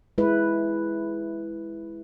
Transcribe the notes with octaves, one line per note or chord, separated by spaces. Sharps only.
G#3 E4 B4